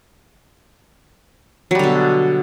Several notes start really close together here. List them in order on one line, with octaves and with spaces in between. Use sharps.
F#3 G3 D3 B2